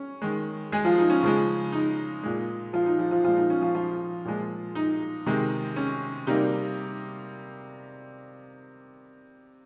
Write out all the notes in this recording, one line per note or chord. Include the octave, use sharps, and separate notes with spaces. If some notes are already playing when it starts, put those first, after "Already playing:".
Already playing: C#4 C#5
D#3 G#3
G#3 G#4
F3 F4
D#4
C#4
C#3 F3 G#3
D#4
A#2 G#3
F3 F4
D#4
F3 F4
F3 F4
A#2 F3 G#3 F4
D#4
C#4
F3 F4
F3 F4
A#2 F3 G#3
D#4
C3 D#3 G#3
C#4
C3 G3 A#3 D#4